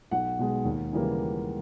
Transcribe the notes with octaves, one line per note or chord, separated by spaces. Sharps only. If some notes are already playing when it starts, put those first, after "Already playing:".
B1 F#5
B2 G#3
D#2
C#3 E3 G3 A#3